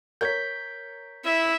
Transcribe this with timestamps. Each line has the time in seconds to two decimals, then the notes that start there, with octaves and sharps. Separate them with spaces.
0.21 A#4 C#5 G6 G#6 B6
1.25 E4 E5